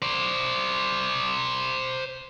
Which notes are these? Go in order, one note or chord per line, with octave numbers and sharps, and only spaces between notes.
C5 D5